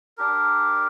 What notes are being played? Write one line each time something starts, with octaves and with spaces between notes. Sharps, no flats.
D4 G4 A#4